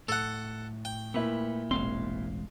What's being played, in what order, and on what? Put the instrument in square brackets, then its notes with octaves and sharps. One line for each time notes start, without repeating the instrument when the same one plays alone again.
[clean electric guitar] A2 [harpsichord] A4 F#5
[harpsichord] G5
[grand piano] A#2 E4 [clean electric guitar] A3 B4
[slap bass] E1 A1 C4 [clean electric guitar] G#3 F5 C6